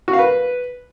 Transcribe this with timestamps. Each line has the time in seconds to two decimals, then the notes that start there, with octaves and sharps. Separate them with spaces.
0.08 F#4
0.13 F5
0.19 B4